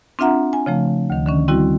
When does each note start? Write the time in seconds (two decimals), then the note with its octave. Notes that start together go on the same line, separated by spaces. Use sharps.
0.19 C4 D4 F4 E5 F#5 A#5
0.53 G#5
0.66 C#3 F3 A3
1.10 D2 D#3
1.26 D3 D#3 C#4
1.48 G3 C4 E4 F#4